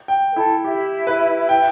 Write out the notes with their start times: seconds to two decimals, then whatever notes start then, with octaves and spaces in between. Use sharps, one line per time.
0.08 G5
0.32 B4
0.36 E4 A4
0.64 E4 G4
1.07 B4
1.49 G5